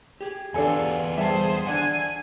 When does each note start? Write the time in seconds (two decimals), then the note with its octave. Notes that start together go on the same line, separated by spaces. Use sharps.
0.21 G4 G#4
0.54 E2 D4 F4 A4 G#5
1.17 G3 G#4 C5 E5 A5
1.67 D4 D5 F#5 G#5